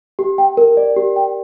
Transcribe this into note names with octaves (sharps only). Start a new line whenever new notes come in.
G4
G5
A#4
D5
G4
G5